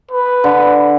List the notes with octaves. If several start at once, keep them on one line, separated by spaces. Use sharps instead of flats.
B4
D3